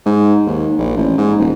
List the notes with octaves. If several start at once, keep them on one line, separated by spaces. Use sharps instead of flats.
G#2
D#2
A#1
A1
G#2
D#1